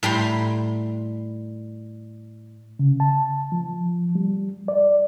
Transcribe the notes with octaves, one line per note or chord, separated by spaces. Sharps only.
A2 G3 A#5 C6
C#3
A5
F3
G3
D5